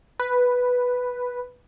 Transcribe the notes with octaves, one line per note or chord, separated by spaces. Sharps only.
B4